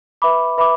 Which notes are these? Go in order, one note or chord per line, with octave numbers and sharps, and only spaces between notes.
B4 E5 B5 D6
B4 E5 B5 D6